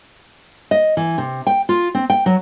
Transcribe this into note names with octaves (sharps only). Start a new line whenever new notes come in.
D#5
E3
C3
G5
F4
C4
G5
F#3